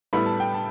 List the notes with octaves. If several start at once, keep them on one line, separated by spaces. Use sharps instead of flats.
A2 G3 B3 E4 B5
A5
G5
A5